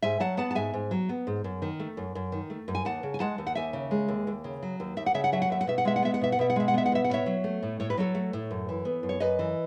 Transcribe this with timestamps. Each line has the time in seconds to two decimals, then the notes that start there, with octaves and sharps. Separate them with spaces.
0.02 G#2 E5 G#5
0.20 F#3 F#5 A5
0.37 B3 F#5 A5
0.51 A5
0.55 G#2 E5 G#5
0.74 G#2
0.91 F#3
1.09 B3
1.27 G#2
1.44 F#2
1.62 D#3
1.79 A3
1.97 F#2
2.15 F#2
2.32 D#3
2.50 A3
2.68 F#2
2.75 G#5
2.85 D#2 F#5 A5
3.03 C#3
3.14 G#5
3.20 G#3 F#5 A5
3.38 D#2
3.47 F#5
3.55 D#2 E5 G#5
3.73 C#3
3.91 G#3
4.08 D#2
4.27 D#2
4.44 C#3
4.63 F#3
4.80 D#2
4.97 D#2 E5
5.06 F#5
5.14 C#3 E5
5.24 F#5
5.32 F#3 E5
5.42 F#5
5.50 D#2 E5
5.61 F#5
5.67 B2 E5
5.78 F#5
5.85 G#3 E5
5.96 F#5
6.03 B3 E5
6.14 F#5
6.21 B2 E5
6.32 F#5
6.39 B2 E5
6.50 F#5
6.56 G#3 E5
6.68 F#5
6.74 B3 E5
6.86 F#5
6.92 B2 E5
7.04 F#5
7.10 A2 C#5 E5
7.26 F#3
7.44 A3
7.63 A2
7.80 A2 C#5
7.90 B4
7.97 F#3 A4 C#5
8.15 A3
8.33 A2
8.51 F#2
8.69 E3
8.85 B3
9.03 F#2
9.09 C#5
9.20 F#2 B4 D#5
9.39 E3